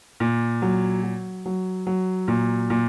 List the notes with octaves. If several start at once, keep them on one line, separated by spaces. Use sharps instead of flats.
A#2
F#3
F#3
F#3
F#3
A#2
A#2